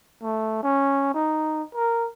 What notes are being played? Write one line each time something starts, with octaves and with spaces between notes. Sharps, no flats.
A3
C#4
D#4
A#4